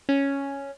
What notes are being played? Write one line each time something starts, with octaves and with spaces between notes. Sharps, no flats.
C#4